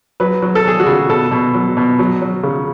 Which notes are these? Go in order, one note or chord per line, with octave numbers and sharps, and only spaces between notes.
F#3 B4
F#3
A4
F#3 G#4
F#4
C#3
B2 A4
B2
F#3
B2
F#3
F#3
C#3